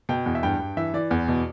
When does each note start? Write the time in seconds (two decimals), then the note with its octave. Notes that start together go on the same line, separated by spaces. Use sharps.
0.09 B2 G5
0.26 E2
0.35 E5
0.43 G2 G5
0.59 G2
0.77 E3 E5
0.94 E3 D5
1.11 E2
1.28 B2